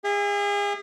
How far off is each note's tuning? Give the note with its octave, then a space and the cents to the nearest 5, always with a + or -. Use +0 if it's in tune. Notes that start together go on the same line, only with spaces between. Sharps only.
G#4 -35 E5 +0